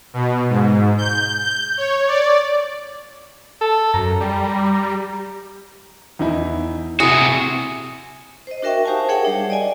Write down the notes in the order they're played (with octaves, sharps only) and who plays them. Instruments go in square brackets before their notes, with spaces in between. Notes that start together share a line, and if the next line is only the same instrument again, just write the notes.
[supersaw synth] B2
G#2
G6
G6
C#5
D5
[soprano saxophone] A4
[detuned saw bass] F#2 [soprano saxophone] A#5
[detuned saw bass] G3
[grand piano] E2 D#4 E4
[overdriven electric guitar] C3 F#4 [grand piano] E4 [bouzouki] G#4
[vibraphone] C5 D#5
D4 F#4 A#4 E5 G5 C#6
D#4 G4 C5 F5 G#5 A5
G#4 A#4 C#5 E5 F#5 G5
G3 D4
D5 D#5 G#5